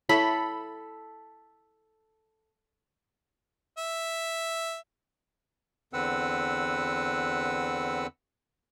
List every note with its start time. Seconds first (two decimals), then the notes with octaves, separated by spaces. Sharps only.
0.09 E4 A4 C#5 B5
3.78 E5
5.93 E2 D3 C4 B4 F#5 E6